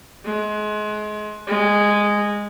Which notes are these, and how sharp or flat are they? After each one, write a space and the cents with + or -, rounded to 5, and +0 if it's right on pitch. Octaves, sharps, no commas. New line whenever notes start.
G#3 +30
G#3 -10